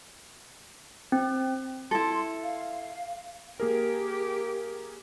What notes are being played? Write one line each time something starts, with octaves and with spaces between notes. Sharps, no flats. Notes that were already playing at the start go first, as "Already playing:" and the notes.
C4
E4 A4 C6
F5
A#3 G4 G#4 A#4